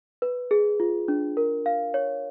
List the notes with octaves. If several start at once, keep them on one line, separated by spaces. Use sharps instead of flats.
B4
G#4
F4
D4
A#4
F5
C#5